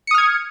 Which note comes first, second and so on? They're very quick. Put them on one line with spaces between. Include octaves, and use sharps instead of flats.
C#7 D#6 F6 G#6